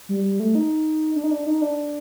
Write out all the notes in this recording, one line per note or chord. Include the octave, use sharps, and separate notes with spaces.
G3
G3
A3
D#4
D4
D#4
D4
D#4
D4